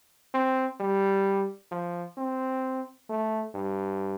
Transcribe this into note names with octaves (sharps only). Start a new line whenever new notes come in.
C4
G3
F3
C4
A3
G2